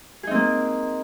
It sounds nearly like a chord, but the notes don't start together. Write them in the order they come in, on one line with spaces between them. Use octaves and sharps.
G#4 D#4 C4 A#3